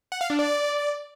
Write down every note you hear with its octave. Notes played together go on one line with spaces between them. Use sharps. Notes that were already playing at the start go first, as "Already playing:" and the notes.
F#5
F5
D4
D5